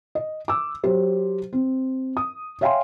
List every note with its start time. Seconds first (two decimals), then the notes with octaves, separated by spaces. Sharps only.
0.15 D#5
0.48 D6 E6
0.84 F#3 G4 C5
1.53 C4
2.17 D#6
2.61 C#5 E5 F5 G5 G#5 C6